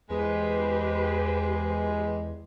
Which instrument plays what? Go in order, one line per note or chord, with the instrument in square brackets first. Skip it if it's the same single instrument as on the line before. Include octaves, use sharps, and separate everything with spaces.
[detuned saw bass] E2 [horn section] G#3 [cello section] G4 B4 C5